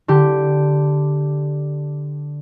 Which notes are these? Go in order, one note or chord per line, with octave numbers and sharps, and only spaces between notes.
D3 G4